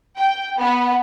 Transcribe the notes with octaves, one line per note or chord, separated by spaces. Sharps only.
G5
B3